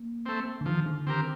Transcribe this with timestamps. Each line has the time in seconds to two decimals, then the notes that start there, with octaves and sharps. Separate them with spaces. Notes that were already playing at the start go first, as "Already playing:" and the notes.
Already playing: A#3
0.26 A3 C4
0.61 D3
0.66 D#3 F3
0.86 D3
1.07 D#3 C4 G4 A#4